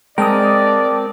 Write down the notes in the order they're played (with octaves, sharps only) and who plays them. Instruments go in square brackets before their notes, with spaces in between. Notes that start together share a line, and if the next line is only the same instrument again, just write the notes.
[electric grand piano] G#3 [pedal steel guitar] C4 A#4 [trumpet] D5 [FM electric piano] G5 A5 D#6